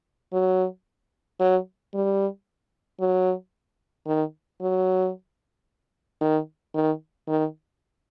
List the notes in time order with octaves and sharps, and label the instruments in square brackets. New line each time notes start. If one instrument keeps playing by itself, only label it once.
[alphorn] F#3
F#3
G3
F#3
D#3
F#3
D#3
D#3
D#3